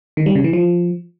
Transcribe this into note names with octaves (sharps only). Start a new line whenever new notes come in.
D#3
G3
C#3
E3
F3